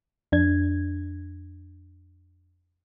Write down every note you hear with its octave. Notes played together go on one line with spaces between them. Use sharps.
F2 D4 G#6